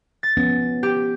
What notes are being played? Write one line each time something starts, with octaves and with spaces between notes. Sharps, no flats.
A6
F3 B3 C#4
G4